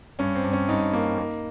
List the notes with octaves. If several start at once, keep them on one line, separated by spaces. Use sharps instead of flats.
G2 C#4
C4
G2
C#4
G2 D#4
A#3
A#3